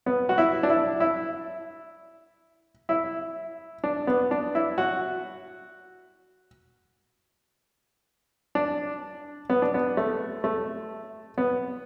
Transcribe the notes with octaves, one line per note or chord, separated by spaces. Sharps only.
B3
F#4
E4
D4
E4
E4
E4
D4
B3
D4
E4
F#4
D4
B3
D4
B3
A3
A3
B3